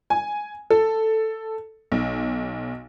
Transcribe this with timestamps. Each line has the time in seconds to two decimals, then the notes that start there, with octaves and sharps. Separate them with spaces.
0.10 G#5
0.70 A4
1.92 B1